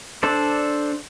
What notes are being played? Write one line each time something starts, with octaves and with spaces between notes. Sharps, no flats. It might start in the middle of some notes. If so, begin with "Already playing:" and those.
D4 A4 C5 D5